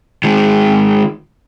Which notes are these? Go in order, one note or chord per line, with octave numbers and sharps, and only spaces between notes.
D#3 G#3